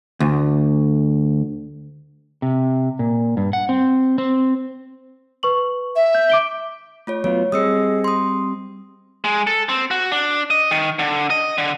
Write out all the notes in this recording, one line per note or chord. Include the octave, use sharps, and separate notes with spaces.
D2
C3
A#2
G2
F#5
C4
C4
B4 C#6 F#7
E5
G6
D6 D7 G7
A3 F4 C#5
F#3 B3 F4 C#5
G3 C4 G#4 D#5 D#6 E6 C#7
C6 D#6
G#3
A4
C4
F#4
D4
D#5
D#3
D3
D#5
D3